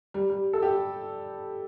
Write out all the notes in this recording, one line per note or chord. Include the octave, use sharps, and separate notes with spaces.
G3
G3
A4
G4